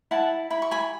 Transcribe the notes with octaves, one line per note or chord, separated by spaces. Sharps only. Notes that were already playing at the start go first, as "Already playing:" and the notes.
E4 F#5 A5
E4 B5
C#6
G#5 B5